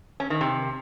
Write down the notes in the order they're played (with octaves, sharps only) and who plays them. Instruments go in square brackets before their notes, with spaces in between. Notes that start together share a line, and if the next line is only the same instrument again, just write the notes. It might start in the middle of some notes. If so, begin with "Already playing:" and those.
[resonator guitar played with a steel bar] C#4
D#3
C3